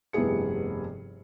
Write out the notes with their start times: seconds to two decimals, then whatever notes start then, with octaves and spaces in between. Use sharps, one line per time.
0.13 F1 G2 B3 E4 G#4 C#7